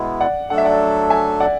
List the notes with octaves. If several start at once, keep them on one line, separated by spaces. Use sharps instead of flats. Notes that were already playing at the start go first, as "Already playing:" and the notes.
Already playing: B2 G#3 B3 E4
D5 F#5
F#3 A3 D4 A4 F#5
E5
D5 F#5
E5 G#5
D5 F#5